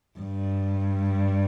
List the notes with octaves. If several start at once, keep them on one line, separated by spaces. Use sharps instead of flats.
G2